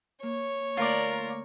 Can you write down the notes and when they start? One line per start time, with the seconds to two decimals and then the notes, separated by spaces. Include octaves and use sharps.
0.23 A#3 C#5
0.77 D3 A3 A#3 F4 A#4 D5